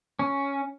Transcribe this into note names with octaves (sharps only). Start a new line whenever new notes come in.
C#4